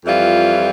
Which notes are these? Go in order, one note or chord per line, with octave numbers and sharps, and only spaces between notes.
F2 E3 G3 F4